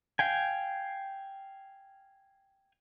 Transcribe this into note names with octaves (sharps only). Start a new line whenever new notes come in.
F5 G5 G#5